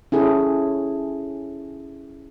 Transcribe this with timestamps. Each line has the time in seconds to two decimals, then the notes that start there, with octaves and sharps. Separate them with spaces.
0.12 C#4 E4 G#4 A4